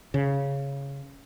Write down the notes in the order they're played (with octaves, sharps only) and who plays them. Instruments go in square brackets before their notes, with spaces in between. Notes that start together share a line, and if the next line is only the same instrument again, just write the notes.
[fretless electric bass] C#3